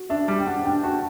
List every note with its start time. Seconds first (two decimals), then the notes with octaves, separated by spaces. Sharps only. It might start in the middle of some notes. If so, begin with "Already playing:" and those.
Already playing: F#4
0.10 D4 E5
0.28 G3
0.39 G5
0.47 D4 F#5
0.65 D4 G5
0.83 F#4 A5